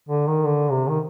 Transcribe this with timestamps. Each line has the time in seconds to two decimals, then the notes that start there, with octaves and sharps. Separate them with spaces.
0.09 D3
0.27 D#3
0.45 D3
0.71 C3
0.89 D#3